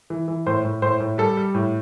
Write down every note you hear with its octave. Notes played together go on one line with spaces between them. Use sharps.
E3
E3
A2 C5
A2
A2 C5
A2
G3 A4
G3
A2